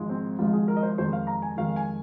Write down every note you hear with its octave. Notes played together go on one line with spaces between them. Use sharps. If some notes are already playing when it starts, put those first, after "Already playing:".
Already playing: G#1 G#2 F3 G#3
C4
G#1 G#2 F3 G#3 F4
G#4
A#4
D#5
C5
F2 D#3 G#3 C5
F5
A#5
G#5
F2 D#3 G#3 F5
G#5